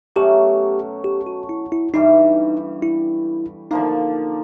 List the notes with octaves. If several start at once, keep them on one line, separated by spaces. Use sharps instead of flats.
B2 F#3 A3 C#4 G4
G4
F#4
E4
E4
G2 E3 G3 D#4
E4
D3 F3 A#3 D#4